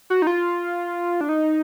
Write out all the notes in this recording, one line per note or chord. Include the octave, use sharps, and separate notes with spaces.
F#4
D#4
F4
D4
D#4